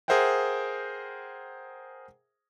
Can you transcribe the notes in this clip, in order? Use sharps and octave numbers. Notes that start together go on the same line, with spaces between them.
G#4 A#4 C5 E5 F#5 G5